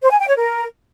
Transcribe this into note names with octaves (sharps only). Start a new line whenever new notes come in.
C5
G#5
G5
C#5
A#4